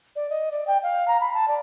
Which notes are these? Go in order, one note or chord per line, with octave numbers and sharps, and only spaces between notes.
D5
D#5
D5
G5
F5
A#5
B5
A5
D5